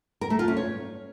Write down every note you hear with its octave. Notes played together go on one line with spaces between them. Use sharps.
A#4
A3
F4
C#4
C#5